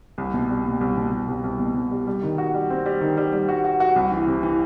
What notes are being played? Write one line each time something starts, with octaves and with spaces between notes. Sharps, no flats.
C2
B2
G3
B2
C2
B2
C2
C2
C2
B2
C2
G3
G3
D#3
F#4
G3
C4
G3
D#3
G3
G3
F#4
F#4
F#4
C2
E3
C3
E3